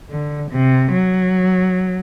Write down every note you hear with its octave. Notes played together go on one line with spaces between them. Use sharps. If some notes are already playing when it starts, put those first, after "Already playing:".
D3
C3
F#3